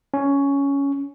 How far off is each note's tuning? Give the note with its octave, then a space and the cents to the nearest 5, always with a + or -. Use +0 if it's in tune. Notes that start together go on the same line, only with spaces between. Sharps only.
C#4 +10